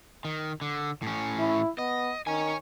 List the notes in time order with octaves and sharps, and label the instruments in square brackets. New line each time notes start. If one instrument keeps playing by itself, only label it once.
[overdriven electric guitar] D#3
D3
A2 C#4
[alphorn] E4
[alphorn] B3 [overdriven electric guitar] D#5
[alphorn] D#3 [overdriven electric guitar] C#5 G#5